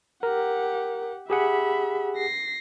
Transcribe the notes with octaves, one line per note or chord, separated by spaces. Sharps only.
G4 A#4 F#5
G4 G#4 E5 F#5 B5
A#6 C7